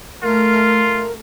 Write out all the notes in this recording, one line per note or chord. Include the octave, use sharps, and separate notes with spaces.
A3 F4 A#4